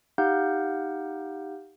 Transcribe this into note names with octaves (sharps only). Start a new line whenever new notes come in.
D#4 G4 F5 F#5 F6 G6